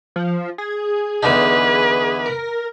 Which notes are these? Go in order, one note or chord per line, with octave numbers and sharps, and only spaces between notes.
F3
G#4
E2 D3 D#4 B4
A#4